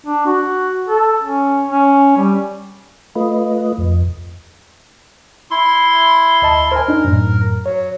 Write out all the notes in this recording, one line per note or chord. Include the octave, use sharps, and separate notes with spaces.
D4
F#4
A4
C#4
C#4
G3
A3 F4 B4 D#5
F2
E4 C6
D2 D#5 A5
A#4 C5 G#5
D4 D#4
F#2 A2
F#3 C#5